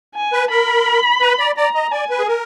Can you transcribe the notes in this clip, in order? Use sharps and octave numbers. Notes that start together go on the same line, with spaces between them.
G#5
B4
A#4 B5
B4
D5
D5 A#5
D#5
D5 G#5
B4
G#4
A#4